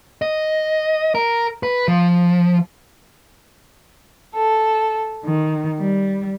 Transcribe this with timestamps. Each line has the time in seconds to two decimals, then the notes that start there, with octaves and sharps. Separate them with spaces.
0.22 D#5
1.15 A#4
1.63 B4
1.88 F3
4.36 A4
5.24 D#3
5.80 G3